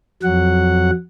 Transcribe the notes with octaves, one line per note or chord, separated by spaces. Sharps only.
F2 F#3 F#5